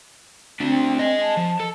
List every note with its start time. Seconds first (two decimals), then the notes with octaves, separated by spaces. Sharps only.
0.60 A3 C4 D4
0.99 G#4 D#5
1.21 A5
1.37 F3
1.60 A4